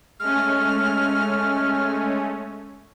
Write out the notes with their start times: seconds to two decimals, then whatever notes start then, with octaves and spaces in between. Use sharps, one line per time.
0.20 G#3 A3 C#4 F6